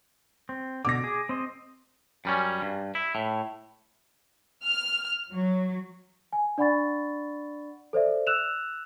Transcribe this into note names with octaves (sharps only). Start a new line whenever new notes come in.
C4
B2 D3 D6 A#6
G#4
C4 C5 D#5
F#2 G3 C#4
G2
E4
A2
F6
F#3
G#5
D4 D5 F#5 B5 C#6 A6
A4 C5 D5 E5
E6 F#6 E7 F7